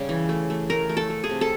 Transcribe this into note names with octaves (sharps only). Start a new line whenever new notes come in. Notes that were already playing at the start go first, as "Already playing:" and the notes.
Already playing: C#3 G3
E3
A3
A3
A3 A#4
A3
A4
A3
G#4
C3
A4